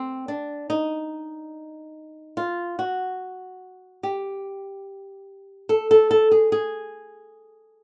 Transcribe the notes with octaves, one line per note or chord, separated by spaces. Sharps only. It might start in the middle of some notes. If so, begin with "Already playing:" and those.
Already playing: C4
D4
D#4
F4
F#4
G4
A4
A4
A4
G#4
G#4